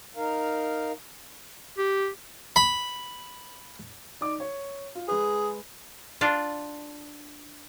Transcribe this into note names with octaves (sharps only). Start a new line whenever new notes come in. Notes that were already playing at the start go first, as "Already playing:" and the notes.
D#4 A#4 F5
G4
B5
D#4 D5 D6
C#5
F4
G#3 G#4 B4
D4 F4